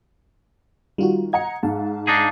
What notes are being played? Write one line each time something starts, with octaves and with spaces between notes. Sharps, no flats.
D#3 G3 F4 F#4
D#5 F#5 A#5 G#6 C#7
G#2 F5 A5
D4 D#4 G#4